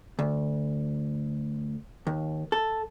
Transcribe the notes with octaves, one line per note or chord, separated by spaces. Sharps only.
D2
D#2
A4